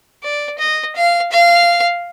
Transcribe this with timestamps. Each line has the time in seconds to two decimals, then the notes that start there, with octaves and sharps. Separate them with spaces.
0.23 D5
0.58 D#5
0.95 F5
1.31 F5